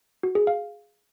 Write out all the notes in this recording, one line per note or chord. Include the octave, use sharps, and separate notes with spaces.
F#4
G#4
F5